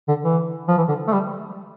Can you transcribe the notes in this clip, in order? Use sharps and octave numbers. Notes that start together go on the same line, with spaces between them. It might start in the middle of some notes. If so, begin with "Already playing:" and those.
D3
E3
F3
E3
D3
A3
G3